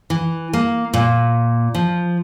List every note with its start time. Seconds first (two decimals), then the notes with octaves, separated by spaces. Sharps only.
0.10 E3
0.53 A#3
0.94 A#2
1.75 F3